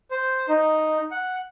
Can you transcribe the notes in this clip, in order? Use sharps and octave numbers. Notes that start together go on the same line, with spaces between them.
C5
D#4
F#5